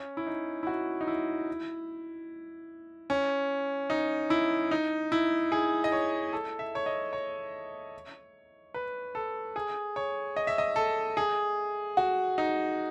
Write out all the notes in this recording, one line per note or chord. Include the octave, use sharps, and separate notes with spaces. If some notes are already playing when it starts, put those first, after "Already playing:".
Already playing: C#4
E4
D#4
E4
F#4
D#4
E4
C#4
D#4
E4
D#4
E4
G#4
D#5
C#5
A4
E5
C#5
D#5
C#5
B4
A4
G#4
C#5
D#5
E5
D#5
A4
G#4
F#4
D#4